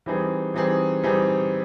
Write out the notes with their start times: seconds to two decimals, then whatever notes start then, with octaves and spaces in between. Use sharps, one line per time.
0.06 E3 G3 C4 D#4 G#4
0.54 E3 G3 C4 D#4 G#4
1.03 E3 G3 C4 D#4 G#4